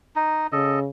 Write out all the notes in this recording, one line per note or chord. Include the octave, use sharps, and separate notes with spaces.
D#4
C#3 A4 D#5